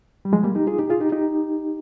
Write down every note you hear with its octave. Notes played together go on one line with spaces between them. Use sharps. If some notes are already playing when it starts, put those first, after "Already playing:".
G3
F3 G#3
G3 A#3
D#4 G4
F4 G#4
D#4 G4
F4 G#4
D#4 G4
D#4 G4